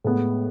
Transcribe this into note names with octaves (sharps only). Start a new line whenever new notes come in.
A2 G#3 B3